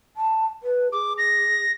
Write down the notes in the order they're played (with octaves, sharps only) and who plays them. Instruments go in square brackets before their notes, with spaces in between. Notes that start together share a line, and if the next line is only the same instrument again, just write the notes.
[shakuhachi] A5
B4
[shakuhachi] G#4 [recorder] D6
[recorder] A#6